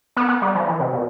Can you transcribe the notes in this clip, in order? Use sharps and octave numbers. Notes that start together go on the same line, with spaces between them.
B3
B3
G3
F3
E3
C3
B2